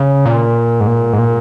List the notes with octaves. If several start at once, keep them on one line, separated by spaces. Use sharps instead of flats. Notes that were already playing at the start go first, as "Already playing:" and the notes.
Already playing: C#3
A#2
G#2
A#2
G#2
A#2